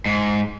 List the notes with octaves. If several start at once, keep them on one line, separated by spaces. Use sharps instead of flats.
G#2